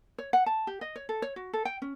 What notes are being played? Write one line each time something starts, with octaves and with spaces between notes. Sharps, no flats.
C#5
F#5
A5
G4
D#5
C#5
A4
C#5
F#4
A4
G5
C#4